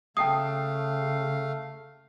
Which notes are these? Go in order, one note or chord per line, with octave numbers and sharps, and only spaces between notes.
C#3 A3 F5 G5 A5 D#6 C7